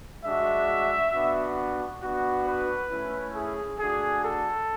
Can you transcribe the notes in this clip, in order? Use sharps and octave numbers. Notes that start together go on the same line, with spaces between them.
G#3 D4 F#4 E5
B3 D4 F#4
B3 D4 F#4
B4
A3 C#4 E4
G#4
A3 D4 F#4 G#4
A4